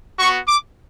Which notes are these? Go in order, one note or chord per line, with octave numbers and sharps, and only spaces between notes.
B3 F#4 C#6
D6